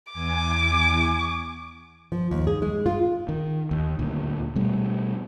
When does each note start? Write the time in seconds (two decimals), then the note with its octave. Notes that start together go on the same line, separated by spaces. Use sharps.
0.13 E2 G#5 D6
2.12 F3
2.31 D#2
2.47 G#4
2.62 G#3
2.86 F4
3.29 D#3
3.71 D#2
3.99 D2 A#2
4.56 B2 G3 A3